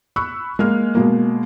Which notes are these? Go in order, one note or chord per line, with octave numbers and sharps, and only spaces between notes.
B5 C#6 E6 F#6
G#3 A#3 F6
B2 G#3 A#3